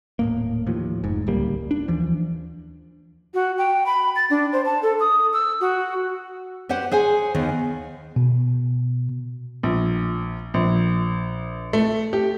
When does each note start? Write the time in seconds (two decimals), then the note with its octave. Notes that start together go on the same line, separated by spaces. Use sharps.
0.19 D#1 A2 A#3
0.67 D#2 A2 F3
1.03 F1 G#2
1.27 D1 C#2 G3 A#3
1.71 D4
1.88 D#2 E3 F3 D4
3.34 F#4
3.58 G5
3.86 B5
4.16 A6
4.30 D4
4.53 C5
4.65 A5
4.82 A4
5.00 D#6
5.33 E6
5.61 F#4
6.69 G4 B4 C5 F#5
6.91 G#4 C5 F#5 G#5
7.35 D#2 D#3 B3
8.16 B2
9.63 A#1
10.54 A#1
11.73 A3
12.13 G4